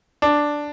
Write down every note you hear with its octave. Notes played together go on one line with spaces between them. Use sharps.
D4